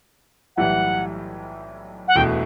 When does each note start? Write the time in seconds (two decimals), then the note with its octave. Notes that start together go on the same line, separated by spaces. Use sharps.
0.57 B1 A2 E3 G3 F#5
2.08 F#5
2.15 E1 E2 B2 A3 E4 G5